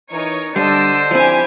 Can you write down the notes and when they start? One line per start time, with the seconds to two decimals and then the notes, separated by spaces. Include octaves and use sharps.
0.12 E3 D#4 A#4 C#5
0.56 D3 G3 D4 C5 D#5 E6
1.11 F3 C4 E4 G4 G#5